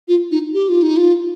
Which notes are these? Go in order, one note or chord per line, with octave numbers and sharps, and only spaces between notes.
F4
D#4
G4
F4
D#4
F4